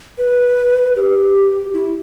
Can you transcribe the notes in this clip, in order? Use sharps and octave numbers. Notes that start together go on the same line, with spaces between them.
B4
G4
E4